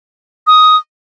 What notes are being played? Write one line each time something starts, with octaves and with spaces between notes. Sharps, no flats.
D#6